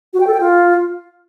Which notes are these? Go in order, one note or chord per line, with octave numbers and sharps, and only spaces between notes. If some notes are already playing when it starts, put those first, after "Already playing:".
F#4
G5
A4
G5
F4